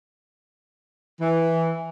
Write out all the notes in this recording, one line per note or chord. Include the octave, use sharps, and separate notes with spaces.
E3